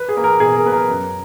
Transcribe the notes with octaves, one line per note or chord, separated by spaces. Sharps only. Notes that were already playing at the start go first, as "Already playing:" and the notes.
Already playing: B4
G#4
A#3
A#4
B2 G#4
A#4
A#3 B4
A#4
F#2